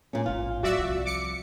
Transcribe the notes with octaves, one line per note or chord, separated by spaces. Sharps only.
A#2 C#4
A1 G#2 F4
F#3 F#4 D5 E5
C2 F3
D6 C#7